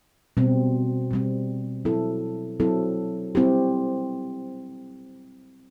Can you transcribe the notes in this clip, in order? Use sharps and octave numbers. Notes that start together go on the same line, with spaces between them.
B2 G3 C4
B2 G3 C4
F#3 C4 E4 A4
F#3 C4 E4 A4
G3 C4 E4 G4